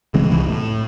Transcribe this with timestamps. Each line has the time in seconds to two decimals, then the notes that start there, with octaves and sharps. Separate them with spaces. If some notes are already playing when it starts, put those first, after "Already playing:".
0.14 C#3 E3 G#3 C4
0.29 F1 C2 C3 E3
0.49 A2